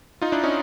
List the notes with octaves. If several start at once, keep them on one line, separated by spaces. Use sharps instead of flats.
D#4 F4
D4 E4
C#4 D#4